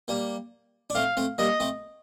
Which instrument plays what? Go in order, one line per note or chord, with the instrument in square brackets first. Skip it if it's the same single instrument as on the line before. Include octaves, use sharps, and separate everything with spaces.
[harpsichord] G3 A#3
D4
[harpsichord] A3 C4 [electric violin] F5
[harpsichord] A3 C4
[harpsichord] G3 A#3 [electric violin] D#5
[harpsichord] A3 C4